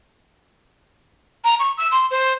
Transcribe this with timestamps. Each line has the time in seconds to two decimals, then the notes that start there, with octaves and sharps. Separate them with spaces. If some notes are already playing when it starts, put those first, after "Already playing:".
1.44 A#5
1.60 C#6
1.78 E6
1.92 C6
2.11 C5